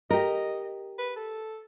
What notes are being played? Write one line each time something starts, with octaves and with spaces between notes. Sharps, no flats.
G4 A#4 D#5
B4
A4